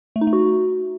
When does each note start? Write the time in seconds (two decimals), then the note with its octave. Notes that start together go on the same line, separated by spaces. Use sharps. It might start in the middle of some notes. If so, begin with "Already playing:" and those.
0.16 A3
0.21 D#4
0.27 A3
0.33 F#4